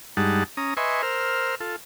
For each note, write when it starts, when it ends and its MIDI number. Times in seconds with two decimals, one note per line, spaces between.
0.17 0.44 43
0.17 0.44 55
0.17 0.44 56
0.17 0.44 63
0.17 0.44 78
0.17 0.44 81
0.57 0.74 61
0.57 0.74 82
0.57 0.74 87
0.77 1.02 71
0.77 1.02 75
0.77 1.02 76
0.77 1.02 80
0.77 1.02 84
0.77 1.02 85
1.03 1.55 70
1.03 1.55 72
1.03 1.55 88
1.03 1.55 89
1.60 1.76 65
1.60 1.76 69